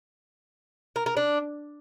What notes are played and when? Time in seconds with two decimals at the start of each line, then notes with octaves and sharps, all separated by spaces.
0.96 A#4
1.06 A#4
1.17 D4